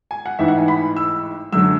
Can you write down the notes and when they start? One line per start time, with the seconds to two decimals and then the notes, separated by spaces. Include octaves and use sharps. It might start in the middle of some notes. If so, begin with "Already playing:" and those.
0.11 G#5
0.26 F#5
0.39 A1 G#2 E3 E5
0.48 F#5
0.58 G#5
0.68 B5
0.97 E6
1.52 F#2 D3 F#3 E6